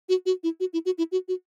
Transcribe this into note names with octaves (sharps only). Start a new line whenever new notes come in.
F#4
F#4
E4
F#4
E4
F#4
E4
F#4
F#4